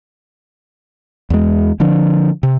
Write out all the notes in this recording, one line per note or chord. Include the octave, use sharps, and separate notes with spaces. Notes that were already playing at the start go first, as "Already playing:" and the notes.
E2 G#3
D3 F3 D4
C3